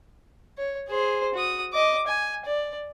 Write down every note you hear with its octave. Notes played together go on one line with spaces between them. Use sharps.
C#5
G#4 C5
F#4 D#6
D#5 D6
G#5
D5